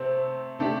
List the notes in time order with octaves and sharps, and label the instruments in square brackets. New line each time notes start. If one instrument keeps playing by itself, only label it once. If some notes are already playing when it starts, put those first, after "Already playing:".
Already playing: [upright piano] C3 A3 [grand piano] C4
[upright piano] C3 A3 D4 G4